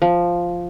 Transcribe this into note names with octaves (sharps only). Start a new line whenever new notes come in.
F3